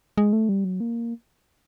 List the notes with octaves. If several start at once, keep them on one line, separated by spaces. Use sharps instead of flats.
G#3
A3
G3
F#3
A#3